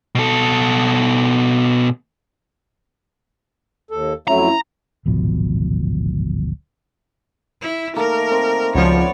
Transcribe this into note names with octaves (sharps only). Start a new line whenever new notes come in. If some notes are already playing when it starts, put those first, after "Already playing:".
B2 A4
D#2 A4
F2 F#3 A3 C#4 E4 A#5
D1 G#1 B2 F3
E4
D#3 A3 A#3 A#4
C4
C#2 F3 B3 F#4 C#5 D5